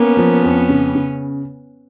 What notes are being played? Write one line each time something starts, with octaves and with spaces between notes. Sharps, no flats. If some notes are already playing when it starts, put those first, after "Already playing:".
Already playing: A#3 B3 C#4
F3
F2
C#3
C#3